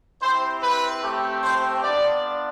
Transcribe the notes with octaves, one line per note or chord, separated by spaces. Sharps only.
C4 E4 G4 C5
B4
A3 C4 G4
C5
B3 D4 F4 D5